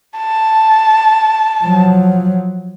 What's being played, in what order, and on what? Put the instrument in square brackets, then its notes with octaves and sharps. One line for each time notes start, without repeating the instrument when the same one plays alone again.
[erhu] A5
[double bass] F3 F#3